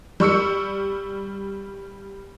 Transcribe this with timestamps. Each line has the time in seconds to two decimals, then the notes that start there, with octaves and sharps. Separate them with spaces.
0.20 G3 C#6 E6 C#7